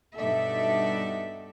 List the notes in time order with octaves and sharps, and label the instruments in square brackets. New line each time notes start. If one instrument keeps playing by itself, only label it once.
[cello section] G2 B2 D#4 A4 D5 E5